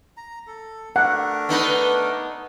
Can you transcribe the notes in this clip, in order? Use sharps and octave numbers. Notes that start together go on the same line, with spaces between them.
A#5
A4
A3 D4 A#4 F#5
B3 D#4 B4